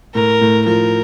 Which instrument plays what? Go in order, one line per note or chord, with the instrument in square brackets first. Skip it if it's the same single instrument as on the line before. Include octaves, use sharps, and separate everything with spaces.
[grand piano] A2 [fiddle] A#4
[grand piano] A2
[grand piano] F3 [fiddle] A#4